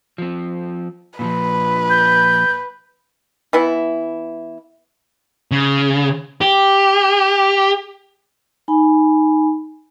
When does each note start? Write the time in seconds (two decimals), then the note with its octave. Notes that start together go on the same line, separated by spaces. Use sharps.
0.18 F3 C4
1.19 A#2 D#3 F3 B4
1.90 G6
3.53 E3 B3 E4
5.51 C#3
6.41 G4
8.68 D#4 G#5 B5